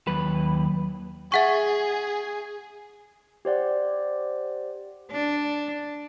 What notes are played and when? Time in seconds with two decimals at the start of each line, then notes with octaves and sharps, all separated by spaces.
0.07 D#2 F#3 B4
1.32 G#4 E5 F#5 C#6
3.45 G4 C5 D5 F#5
5.11 D4